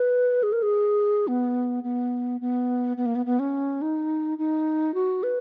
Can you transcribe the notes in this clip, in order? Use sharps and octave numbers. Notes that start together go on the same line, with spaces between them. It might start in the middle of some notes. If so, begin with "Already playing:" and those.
Already playing: B4
G#4
A#4
G#4
B3
B3
B3
B3
A#3
B3
B3
C#4
D#4
D#4
F#4
B4